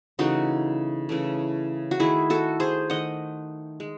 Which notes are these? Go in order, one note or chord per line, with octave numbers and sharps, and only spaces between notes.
C#3 E3 A3 D#4 F#4
C#3 E3 A3
F#4
D#3 A3 E4 G#4
F#4 A4
G#4 C5
D#3 A3 D#5 F#5
G#3